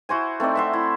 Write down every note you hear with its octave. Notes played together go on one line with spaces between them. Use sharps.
E4 F#4 C5 G#5
A3 C4 D#4 D5
E5 F#5 C6
E4